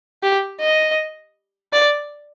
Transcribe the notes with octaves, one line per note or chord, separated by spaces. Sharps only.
G4
D#5
D5